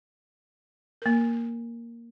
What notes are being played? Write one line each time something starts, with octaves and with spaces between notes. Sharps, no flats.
A#3 A#4